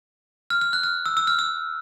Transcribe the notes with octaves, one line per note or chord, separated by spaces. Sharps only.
F6
F6
F#6
F6
E6
E6
F6
E6